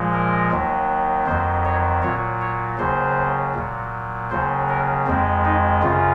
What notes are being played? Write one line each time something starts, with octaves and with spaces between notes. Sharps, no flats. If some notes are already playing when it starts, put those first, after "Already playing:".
Already playing: A#2 F3 G#3
A#4
D#2 D#3 F#3
F2 D#3 F#3 C5
C#5
A#2 F#3 C#5
C#5
D#2 C#3 F#3 C5
A#2 F#3
D#2 C#3 F#3 C5
A#4
F2 D#3 G#3 C4
D#4
F#2 C#3 F4